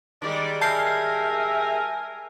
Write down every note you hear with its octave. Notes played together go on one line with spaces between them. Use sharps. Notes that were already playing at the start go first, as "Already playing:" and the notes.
D#3 G3 G#3 D5
A#4 E5 G#5 A5 G6 C7